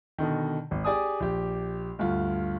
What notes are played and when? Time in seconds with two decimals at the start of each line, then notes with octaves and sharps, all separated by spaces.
0.18 B2 D3 D#3
0.71 G#1
0.84 G4 G#4 D5 G#5 D#6
1.20 A#1 G4
1.99 D2 G2 F4